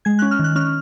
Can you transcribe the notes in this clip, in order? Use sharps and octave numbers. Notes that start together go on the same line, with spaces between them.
G#3 G#6
C#4 F#6
F6
D#3 F#6
C#4 F6